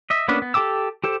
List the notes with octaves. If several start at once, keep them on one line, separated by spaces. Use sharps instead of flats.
D#5 E5
A#3 B3 C#4 D4 B4
B3
G4 A4 G5 D6 E6
G4 A4 C5